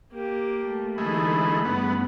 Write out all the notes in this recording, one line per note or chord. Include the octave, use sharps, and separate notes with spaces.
A#3 G4
A3
D3 E3 G#3 A3 D#4 B5
G2 C#3 A3 B3